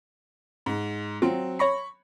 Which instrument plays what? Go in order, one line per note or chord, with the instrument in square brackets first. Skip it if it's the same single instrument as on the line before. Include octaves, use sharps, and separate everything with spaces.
[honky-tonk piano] G#2
[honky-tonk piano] F#3 C4 [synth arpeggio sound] F4
[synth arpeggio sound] C#5 A#6 [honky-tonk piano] B5 C#6